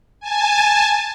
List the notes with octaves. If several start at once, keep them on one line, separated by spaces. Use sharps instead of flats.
G#5 A5